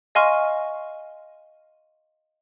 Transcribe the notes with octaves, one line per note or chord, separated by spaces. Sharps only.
D#5 F5 G#5 C6 C#6 F6